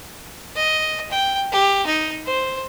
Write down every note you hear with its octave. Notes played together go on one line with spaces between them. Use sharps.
D#5
G5
G4
D#4
C5